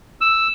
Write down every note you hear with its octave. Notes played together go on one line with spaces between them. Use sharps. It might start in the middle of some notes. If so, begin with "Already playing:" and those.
E6